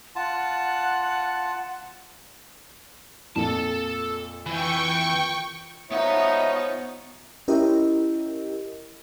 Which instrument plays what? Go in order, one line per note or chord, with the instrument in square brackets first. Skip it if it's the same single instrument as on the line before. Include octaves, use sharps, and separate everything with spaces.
[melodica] F4 A5 [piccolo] F#5
[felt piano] F2 A#2 [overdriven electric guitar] A4 A5
[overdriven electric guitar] E3 [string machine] G5 C#6
[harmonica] F3 C#5 [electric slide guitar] B3 F#5 [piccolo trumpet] D#4 [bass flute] E5
[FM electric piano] C#4 E4 G4 A#4 D#5